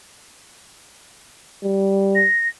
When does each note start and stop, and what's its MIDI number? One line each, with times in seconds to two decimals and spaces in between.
1.63 2.25 55
2.15 2.48 94